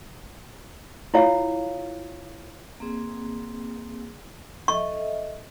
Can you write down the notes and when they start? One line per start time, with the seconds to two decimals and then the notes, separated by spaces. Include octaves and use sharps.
1.14 E4 F4 C#5 F5 F#5
2.80 A#3 C4 G#4
4.68 A4 D#5 E5 C#6